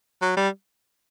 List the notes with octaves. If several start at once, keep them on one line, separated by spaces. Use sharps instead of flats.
F#3
G3